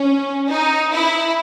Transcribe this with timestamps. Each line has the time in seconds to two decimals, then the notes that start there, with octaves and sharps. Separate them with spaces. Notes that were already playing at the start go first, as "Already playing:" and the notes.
Already playing: C#4
0.48 D#4
0.92 E4